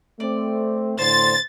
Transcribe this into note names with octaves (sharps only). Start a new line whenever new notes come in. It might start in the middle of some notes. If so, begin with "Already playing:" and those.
A3 C4 D5
A2 D3 C5 A6